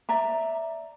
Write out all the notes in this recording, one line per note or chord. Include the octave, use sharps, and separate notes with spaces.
D5 E5 A#5